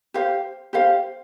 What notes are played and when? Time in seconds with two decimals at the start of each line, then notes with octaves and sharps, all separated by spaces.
0.14 G4 C5 F5
0.73 G4 C5 F5